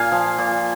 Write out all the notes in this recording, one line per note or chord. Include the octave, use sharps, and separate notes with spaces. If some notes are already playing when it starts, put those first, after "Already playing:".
Already playing: A#2 F5 G#5
F3
A#2